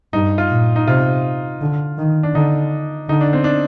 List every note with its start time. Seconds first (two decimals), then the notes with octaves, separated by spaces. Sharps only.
0.13 G2 D#4
0.38 F4
0.50 A#2
0.76 D#4
0.87 C3 F4
1.61 D3
1.98 D#3
2.23 D4
2.34 D3 D#4
3.09 D3 D#4
3.21 D4
3.33 C4
3.44 D4